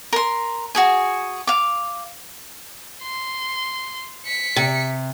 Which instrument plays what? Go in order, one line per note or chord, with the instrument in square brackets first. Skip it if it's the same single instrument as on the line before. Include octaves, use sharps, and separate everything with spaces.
[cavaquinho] A#4 C6
F#4 G#4 G#5
F5 D6
[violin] C6
B6 C#7
[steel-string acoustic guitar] C3